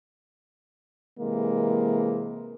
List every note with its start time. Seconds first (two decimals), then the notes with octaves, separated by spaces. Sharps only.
1.20 C3 E3 G#3 A#3